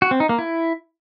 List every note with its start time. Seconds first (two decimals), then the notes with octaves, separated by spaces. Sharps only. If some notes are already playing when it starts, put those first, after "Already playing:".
0.02 F#4
0.11 C4
0.20 D#4
0.29 A#3
0.39 E4